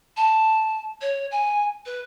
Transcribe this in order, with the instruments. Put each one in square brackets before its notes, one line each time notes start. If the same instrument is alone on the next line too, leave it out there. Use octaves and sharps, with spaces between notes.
[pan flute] A5
C#5
G#5
B4